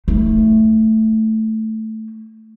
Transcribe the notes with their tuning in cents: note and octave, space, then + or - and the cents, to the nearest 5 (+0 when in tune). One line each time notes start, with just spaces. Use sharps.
A3 +0 E4 -40